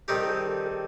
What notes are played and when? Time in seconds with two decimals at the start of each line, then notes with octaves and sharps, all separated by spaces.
0.08 D#3 G3 C4 D#4 G4 A4
0.22 A4
0.27 G#4
0.47 A4
0.65 A4